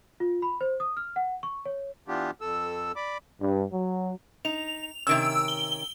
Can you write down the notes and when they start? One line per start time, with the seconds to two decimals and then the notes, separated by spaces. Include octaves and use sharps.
0.20 F4
0.42 B5
0.61 C5
0.80 D#6
0.97 F6
1.16 F#5
1.43 C#6
1.66 C#5
2.08 E3 B3 D4 F4 G4
2.41 F2 A4 E6
2.96 D5 B5 D6
3.40 G2
3.71 F#3
4.45 D#4 F7
5.07 C3 D#3 C#4 E6 D7
5.48 G7